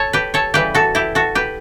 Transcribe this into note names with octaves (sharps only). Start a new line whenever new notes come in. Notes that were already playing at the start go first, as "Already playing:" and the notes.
Already playing: A4 C#5
G4 B4
A4 C#5
C#3 E3 G3 G4 B4
F#4 A4
E4 G4
F#4 A4
G4 B4